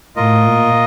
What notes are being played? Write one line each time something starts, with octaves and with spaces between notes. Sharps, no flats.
A2 F4 A#4 D#5
A#2